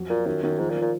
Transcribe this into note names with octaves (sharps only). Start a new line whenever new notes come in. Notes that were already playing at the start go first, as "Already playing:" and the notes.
Already playing: F2 F#3
A#2 F4
F#2 D#3
F#2 D#3
G#2 F3
A#2
F3
A#2